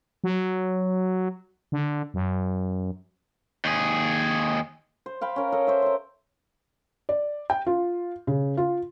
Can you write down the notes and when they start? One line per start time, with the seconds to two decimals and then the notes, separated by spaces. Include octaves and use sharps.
0.24 F#3
1.72 D3
2.14 F#2
3.65 D#2 G#4
5.06 C5
5.21 F5 G5 B5
5.36 C#4 A#4
5.52 A4 A#4 D#5
5.67 C5 C#5 E5
5.82 A#4 C5
7.09 D5
7.50 G5
7.66 F4
8.27 C#3
8.57 F4